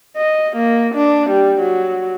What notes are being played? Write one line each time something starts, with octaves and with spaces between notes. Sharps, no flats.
D#5
A#3
D4
G3
F#3